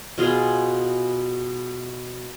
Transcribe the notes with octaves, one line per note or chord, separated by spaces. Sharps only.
B2 F4 G#4